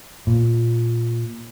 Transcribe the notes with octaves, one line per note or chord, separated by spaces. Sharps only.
A#2